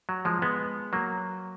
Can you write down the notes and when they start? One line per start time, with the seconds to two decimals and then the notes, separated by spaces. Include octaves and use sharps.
0.09 F#3
0.25 F3 G#3
0.42 G#3 B3
0.93 F#3 A#3